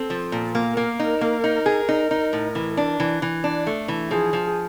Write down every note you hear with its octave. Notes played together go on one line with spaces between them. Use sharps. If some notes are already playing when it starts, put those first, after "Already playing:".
Already playing: C4 A4
F3
A#2
A#3 A#4
A#3
D#4
A#3
D#4
G#4
D#4
D#4
A2
E3
D4
E3
E3
D4
A3
E3
F3 G#4
F3